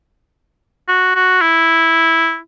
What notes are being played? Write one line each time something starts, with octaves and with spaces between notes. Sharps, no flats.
F#4
F#4
E4